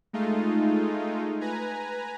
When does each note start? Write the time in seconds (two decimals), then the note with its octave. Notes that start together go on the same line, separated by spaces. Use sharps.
0.13 G#3 A3 D#4 F4
1.41 B4 G#5 A#5